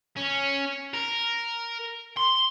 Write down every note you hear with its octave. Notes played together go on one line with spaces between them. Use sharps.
C#4
A#4
C6